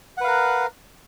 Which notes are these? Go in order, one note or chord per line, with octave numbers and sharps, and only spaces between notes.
A#4 B4 F5 F#5